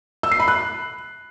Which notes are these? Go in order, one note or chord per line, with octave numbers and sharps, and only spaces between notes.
E6
C7
B5
F#6